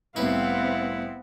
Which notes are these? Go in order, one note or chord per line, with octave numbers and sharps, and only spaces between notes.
C2 A2 B3 C4 E4 B4 F5 F#5